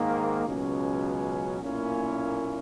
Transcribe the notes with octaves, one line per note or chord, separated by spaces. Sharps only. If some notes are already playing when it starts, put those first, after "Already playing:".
Already playing: G#2 D#3 A#3
C#2 B2 F#3 C#4
B1 A#2 A#3 C#4 E4